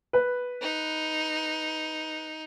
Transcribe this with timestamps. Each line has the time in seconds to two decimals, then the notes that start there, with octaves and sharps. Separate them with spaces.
0.13 B4
0.62 D#4